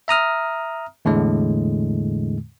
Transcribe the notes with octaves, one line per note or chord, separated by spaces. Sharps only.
E5 A#5 D#6 F6
E2 A2 D3 G#3